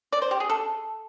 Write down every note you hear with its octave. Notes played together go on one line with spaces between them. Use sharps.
D5
C5
G4
G#4
A4